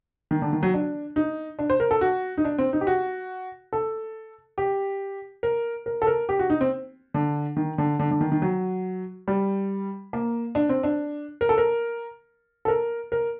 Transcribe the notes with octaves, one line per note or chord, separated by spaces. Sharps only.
D#3
D3
D#3
F#3
D4
D#4
D4
C5
A#4
A4
F#4
D#4
D4
C4
D#4
G4
F#4
A4
G4
A#4
A#4
A4
A#4
G4
F#4
D#4
C4
D3
D#3
D3
D3
D3
D#3
D#3
F#3
G3
A#3
D4
C4
D4
A#4
A4
A#4
A4
A#4
A#4